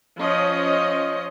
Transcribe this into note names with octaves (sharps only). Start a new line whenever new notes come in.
F3 C#4 D#5